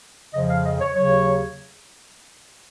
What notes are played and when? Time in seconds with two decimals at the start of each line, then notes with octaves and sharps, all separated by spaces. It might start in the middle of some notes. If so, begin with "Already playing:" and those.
0.33 F2 C#3 F3 D#5
0.49 F5
0.64 D#5
0.80 C#5
0.95 D#2 C#3 F#3 C#5